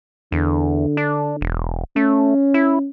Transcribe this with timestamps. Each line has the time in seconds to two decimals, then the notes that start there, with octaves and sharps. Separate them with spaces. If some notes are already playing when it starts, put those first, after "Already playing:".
0.32 E2 D3
0.97 D4
1.41 E1
1.96 A3 C#4
2.54 E4